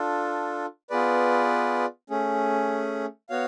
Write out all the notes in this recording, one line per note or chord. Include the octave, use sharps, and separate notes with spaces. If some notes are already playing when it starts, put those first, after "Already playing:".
Already playing: D4 F4 A4
B3 F4 G#4 B4 D5
A3 C#4 G#4
B3 F#4 C#5 F5